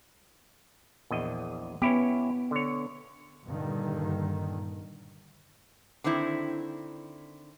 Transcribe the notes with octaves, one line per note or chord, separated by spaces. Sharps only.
A#1 E2 D#5
B3 C#4 E4 G4
D3 C#5
G2 A#2 D3 D#3
D3 D#3 C4 E4